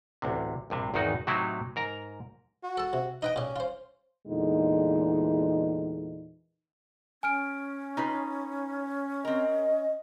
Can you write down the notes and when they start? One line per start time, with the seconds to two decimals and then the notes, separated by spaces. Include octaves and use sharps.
0.22 A1 D2 C3
0.70 A#1 G2 C3
0.94 G#1 E2 G#2 D#3 D#4 F#4
1.27 A2 C3 F#3 C4 D#4 E4
1.76 G#2 A#4 A#5
2.63 F#4
2.78 A4 A5
2.93 C3
3.22 D#4 B4 D#5 G5
3.36 A#2 C#4 G4
3.56 F4 C5
4.27 E2 A#2 D3 E3 G#3 D#4
7.23 C#4 G#5 F6 D7
7.97 D#4 F4 B4
9.25 C4 A#4 D#5